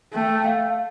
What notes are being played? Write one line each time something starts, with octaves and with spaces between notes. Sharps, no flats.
A3 G5
G5
F5